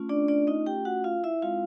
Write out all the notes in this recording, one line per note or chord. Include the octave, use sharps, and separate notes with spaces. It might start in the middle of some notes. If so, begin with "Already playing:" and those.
Already playing: A3 C#4 F4
D4 D5
D4 D5
D#4 D#5
G4 G5
F#4 F#5
F4 F5
E4 E5
G#3 C4 E4 F4 F5